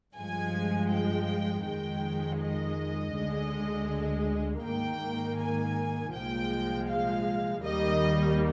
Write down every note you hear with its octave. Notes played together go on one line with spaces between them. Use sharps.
G2 F3 G#3 G#5
G5
F2 D#3 G#3 G5
D#5
D2 D3 G#3
G#2 D#3 A#3 G5
G#5
C2 A#2 F3 G#3 G5
F5
D#2 D#3 G3 A#3 D#5